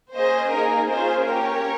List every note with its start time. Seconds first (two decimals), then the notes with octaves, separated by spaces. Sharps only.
0.14 A#3 C#4 G#4 C5 D#5
0.52 A#3 D#4 G#4 A#4
0.90 C#4 F4 G#4 C5
1.28 A#3 C#4 G4 A#4 C#5